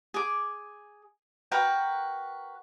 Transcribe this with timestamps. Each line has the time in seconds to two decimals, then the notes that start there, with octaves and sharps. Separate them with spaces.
0.14 G#4 D6
1.52 F#4 A#4 B4 G5